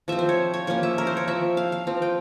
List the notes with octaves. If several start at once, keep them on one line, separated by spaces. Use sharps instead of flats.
F3 C4 E5
C5
C#5
C#5
F3 A#3 C#4 C#5
E5
A#4
C5
C#5
F3 C4 E5
F5
F5
F3 C4
G5